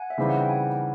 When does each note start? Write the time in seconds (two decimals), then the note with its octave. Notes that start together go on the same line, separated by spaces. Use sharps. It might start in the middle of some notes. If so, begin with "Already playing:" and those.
Already playing: F#5 G#5
0.10 E5
0.18 C#3 E3 G3 C4 D#4 F5
0.29 F#5
0.39 G5
0.49 F#5 G#5